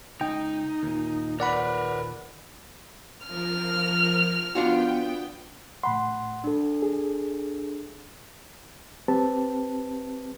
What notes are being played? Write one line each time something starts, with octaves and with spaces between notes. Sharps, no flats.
C#2 D#4 G5
D#2 A#2
A#4 B4 D5 F#5 B5
F3 A#4 F6
B3 D4 F4 F#4 G5
A2 F#5 B5 C6
D4 A4
G#4
C4 G4 B4 A5